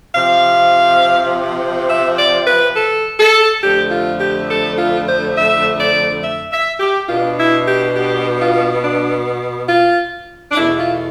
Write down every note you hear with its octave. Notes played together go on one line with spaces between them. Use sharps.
C3 F3 C4 F5
E5
D5
B4
A4
A4
F2 D3 A3 G4
F4
G4
A4
F4
C5
E5
D5
E5
E5
G4
B2 B3 D4 F4
E4
G4
G4
F4
D4
F4
D4
E2 B2 A3 E4
F4